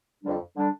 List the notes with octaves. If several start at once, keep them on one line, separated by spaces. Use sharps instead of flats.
F2 D3 G3 D4
D3 G3 D4